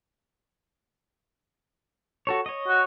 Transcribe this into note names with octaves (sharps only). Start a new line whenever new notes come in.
F#4 A4 C#5
C#5 D#5
F#4